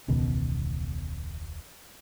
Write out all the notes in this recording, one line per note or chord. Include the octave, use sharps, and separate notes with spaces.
E1 C#2 B2 D#3